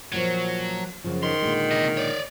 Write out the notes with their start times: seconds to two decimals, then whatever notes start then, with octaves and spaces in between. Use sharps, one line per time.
0.12 A#2 F3 F#3
1.04 F#2 C#3 F3
1.23 D#3 C6
1.42 A#2 D3 G#3
1.71 C3 D#5
1.97 C#5 D5